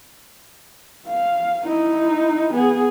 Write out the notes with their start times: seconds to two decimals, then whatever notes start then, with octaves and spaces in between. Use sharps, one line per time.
1.07 F5
1.65 D#4 E4
2.53 B3 G#4